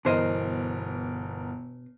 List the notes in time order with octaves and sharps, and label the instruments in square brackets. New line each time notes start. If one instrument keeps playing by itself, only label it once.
[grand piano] G1 E3 A#4 [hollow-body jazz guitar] B2 C5 D#5